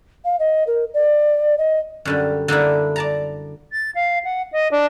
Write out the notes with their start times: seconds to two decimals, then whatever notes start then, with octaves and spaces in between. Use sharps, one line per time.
0.25 F5
0.40 D#5
0.67 A#4
0.94 D5
1.58 D#5
2.05 F#2 D3 G3
2.48 D3 A#3 D4 E4
2.96 D5 A5 A#5
3.72 A6
3.95 F5
4.24 F#5
4.52 D#5
4.72 D4